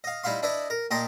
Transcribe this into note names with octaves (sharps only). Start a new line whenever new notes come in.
D#5 F5
G3 D#4 E4 F5 C6
D4 E4 B4 D#5
A#4
A#2 G4 A#4 D#5 A5 C6